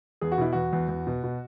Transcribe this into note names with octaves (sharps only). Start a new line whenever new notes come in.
E2 G#4
F#4
B2 E4
E2 F#4
E2
E2
B2
B2